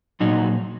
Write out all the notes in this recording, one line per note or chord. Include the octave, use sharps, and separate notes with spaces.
A#2 F#3 D#4 F#4